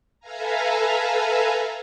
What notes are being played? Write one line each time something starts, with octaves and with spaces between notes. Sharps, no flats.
A4 B4 E5 F5 G#5 A#5